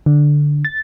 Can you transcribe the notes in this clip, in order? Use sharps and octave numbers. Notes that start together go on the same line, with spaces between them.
D3
A6